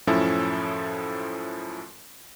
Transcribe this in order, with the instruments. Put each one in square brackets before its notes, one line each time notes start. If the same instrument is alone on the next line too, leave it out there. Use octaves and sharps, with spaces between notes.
[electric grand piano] F#2 A2 F3 C#4 E4 A4